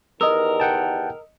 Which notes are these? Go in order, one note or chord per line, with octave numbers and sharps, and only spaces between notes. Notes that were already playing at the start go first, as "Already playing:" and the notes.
E2 D#3 G4 A#4 D#5 D#6 E6
F#5 G5 A5